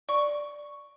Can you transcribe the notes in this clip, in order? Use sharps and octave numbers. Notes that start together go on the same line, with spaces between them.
D5 C#6